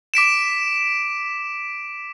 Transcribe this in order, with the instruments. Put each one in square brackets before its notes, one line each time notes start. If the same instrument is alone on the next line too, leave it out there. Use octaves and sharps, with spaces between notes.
[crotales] D6 B6 D7 E7